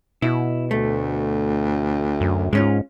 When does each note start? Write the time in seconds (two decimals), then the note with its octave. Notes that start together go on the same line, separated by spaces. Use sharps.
0.22 B2 E4
0.71 D2 A3
2.21 F#2
2.53 G#2 G#3 C#4 F4